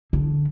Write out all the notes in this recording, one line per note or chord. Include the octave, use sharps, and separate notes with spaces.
D3